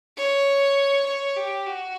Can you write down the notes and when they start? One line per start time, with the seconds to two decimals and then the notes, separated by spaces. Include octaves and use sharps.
0.17 C#5
1.06 C#5
1.36 G4
1.67 F#4